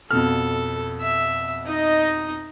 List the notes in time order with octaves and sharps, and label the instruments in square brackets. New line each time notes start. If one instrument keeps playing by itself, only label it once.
[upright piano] F2 B2 F6 [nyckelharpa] A4
[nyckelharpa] E5
D#4 D#5